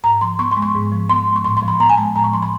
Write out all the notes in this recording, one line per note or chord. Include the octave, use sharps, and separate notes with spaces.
G#2 A#5
F3 C6
B3 C#6
C6
G#3
C#6
G#2
F3
B3 C6
G#3
C#6
A2 C6
C6
F3
B5
B3 A#5
G#5
G#3 A5
A2 A#5
C#6
F3 C6
B5